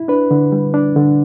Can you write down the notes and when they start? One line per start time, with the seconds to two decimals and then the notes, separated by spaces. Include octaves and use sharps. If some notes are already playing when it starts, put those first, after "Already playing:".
Already playing: E4
0.08 D4 B4
0.31 D3
0.52 G3
0.74 D4
0.96 D3